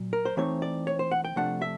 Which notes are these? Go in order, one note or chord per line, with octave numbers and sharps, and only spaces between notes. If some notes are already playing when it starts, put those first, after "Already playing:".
Already playing: A#2 F#3
A#4
C5
E3 A3 C4 D#4 C#5
D5
C#5
C5
F#5
G5
C3 F3 A3 D4 F#5
E5